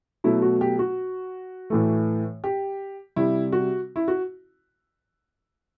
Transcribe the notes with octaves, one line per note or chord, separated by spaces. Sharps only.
B2 F#3 A3 E4
F#4
G4
F#4
A2 E3 A3
G4
C3 G3 E4
F#4
E4
F#4